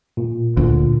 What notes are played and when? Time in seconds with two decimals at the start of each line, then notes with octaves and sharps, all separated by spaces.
0.17 A#2
0.57 D2 A#2